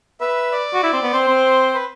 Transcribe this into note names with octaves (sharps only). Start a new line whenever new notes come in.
B4 E5
D5
F#4
E4
C4
B3
C4 C5
C4
B4